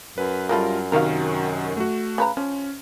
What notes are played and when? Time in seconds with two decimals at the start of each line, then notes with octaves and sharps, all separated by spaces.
0.18 F#2 B4
0.49 C#3 G3 E4 F4 A4 A#4
0.92 C3 D#3 F#4 A#4 F5
1.77 A3 F#4
2.18 C#3 B4 A#5
2.37 F3 C#4